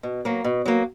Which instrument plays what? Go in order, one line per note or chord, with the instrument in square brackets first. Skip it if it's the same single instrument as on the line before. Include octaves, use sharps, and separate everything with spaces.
[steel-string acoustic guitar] B2
F#3 A#3
B2
F#3 A#3